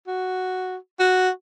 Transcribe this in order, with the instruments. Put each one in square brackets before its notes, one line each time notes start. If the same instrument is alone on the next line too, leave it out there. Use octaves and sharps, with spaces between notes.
[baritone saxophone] F#4
F#4